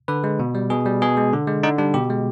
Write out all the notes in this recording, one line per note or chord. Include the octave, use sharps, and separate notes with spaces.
D3 B4
G#3
B2
G3
B2 G#4
G3
B2 G#4
G#3
D3
G#3
D3 D#4
G3 D4
B2 G4
G#3